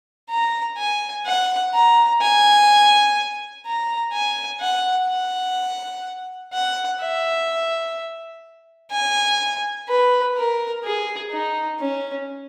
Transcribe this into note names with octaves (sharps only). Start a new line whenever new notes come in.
A#5
G#5
F#5
A#5
G#5
A#5
G#5
F#5
F#5
F#5
E5
G#5
B4
A#4
G#4
D#4
C#4